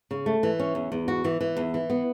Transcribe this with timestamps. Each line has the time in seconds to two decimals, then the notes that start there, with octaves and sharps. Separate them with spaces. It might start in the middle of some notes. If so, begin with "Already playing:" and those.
0.11 C#3
0.26 A3
0.43 E3
0.60 C#4
0.75 E2
0.92 E2
1.08 F#4
1.24 E3
1.41 E3
1.57 E2
1.74 E3
1.90 B3